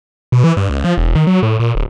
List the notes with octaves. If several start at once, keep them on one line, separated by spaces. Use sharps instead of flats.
B2
E3
G2
C#2
F3
E1
D#3
F#3
A2
A#2
D1